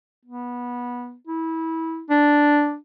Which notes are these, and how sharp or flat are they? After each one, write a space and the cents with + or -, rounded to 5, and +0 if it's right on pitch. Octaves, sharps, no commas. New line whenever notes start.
B3 -20
E4 -25
D4 -5